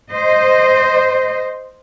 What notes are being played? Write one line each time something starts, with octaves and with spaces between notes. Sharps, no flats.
C5 D#5